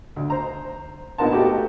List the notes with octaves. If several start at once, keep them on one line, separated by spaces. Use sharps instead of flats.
D2
C5 A#5
A#2 B3 D#4 A#4 F#5 A5
A3 F#4 G4